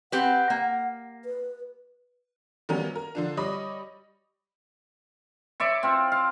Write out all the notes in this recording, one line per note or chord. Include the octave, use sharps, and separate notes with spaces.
C4 G4 B4 F#5
A#3
B4
D#3 F#3 G3 A#3 B3 C#4
A#4
D3 F3 D4
G3 C#5 D#5 B5 D6
C#5 D5 E5 C#6
C4 F4
F5